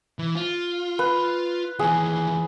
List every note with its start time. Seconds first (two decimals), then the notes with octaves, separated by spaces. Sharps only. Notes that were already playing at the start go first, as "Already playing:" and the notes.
0.19 E3
0.35 F4
0.99 B4
1.79 D#2 E3 G#4